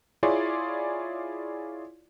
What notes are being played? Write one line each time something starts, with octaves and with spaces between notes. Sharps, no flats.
E4 F4 G#4 C#5 D5 C6